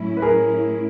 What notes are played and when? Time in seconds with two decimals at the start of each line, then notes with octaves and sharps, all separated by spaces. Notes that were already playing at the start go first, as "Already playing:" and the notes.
Already playing: A2 F#3 A3 C#4 E4
0.17 B4
0.22 G#4 A#4